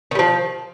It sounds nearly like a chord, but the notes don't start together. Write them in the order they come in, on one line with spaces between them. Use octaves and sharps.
D#3 G3 F3